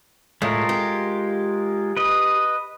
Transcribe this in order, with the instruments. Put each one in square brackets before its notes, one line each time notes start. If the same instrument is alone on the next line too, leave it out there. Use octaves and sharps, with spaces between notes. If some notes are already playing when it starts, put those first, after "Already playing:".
[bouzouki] A2 [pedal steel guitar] G#3 F4 A#4
[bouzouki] G4
[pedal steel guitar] B4 D#5